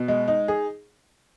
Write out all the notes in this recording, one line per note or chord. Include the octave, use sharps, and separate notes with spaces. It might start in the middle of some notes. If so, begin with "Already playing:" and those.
Already playing: B2
G#3
D#4
G#4